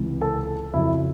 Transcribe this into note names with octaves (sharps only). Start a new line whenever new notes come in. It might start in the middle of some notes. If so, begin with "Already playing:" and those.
Already playing: C#2 C3 E3
A4 A5
F2 C#3 F#3 E4 E5